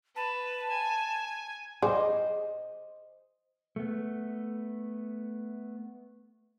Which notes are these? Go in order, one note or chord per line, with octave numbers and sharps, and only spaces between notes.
B4 A5
G#5
G#4 C5 D5 D#5
A3 B3